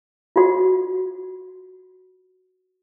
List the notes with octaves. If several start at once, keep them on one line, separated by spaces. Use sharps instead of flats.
F4 F#4